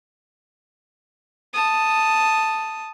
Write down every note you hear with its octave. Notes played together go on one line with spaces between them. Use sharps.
A5 D#6